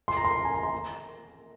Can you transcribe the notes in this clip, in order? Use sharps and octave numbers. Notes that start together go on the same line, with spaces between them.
C6
A#5
C6
A#5
G#5
A#5
C6
A#5